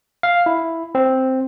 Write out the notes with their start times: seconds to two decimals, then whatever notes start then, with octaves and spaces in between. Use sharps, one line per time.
0.23 F5
0.46 E4
0.95 C4